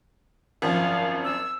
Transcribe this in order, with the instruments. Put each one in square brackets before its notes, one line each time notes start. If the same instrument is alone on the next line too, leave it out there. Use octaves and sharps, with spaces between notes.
[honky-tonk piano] G#1 F#2 F3 [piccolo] F5
[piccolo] E6